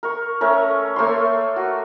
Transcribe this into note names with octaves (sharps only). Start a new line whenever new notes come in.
A#4 C#6
A3 C#4 A#4
A3 A#3 C#5 C6
F#4